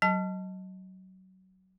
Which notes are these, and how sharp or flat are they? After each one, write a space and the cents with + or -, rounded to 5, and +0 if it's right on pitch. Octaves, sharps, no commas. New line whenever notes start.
F#3 +20 A5 +0